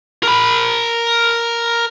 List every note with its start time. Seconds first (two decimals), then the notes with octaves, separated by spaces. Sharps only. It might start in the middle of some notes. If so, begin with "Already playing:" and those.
0.23 A#4 B5